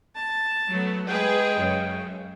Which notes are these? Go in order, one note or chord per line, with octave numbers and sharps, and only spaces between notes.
A5
F#3 A3 B3
G#3 G#4 B4 G5
F#2 C#3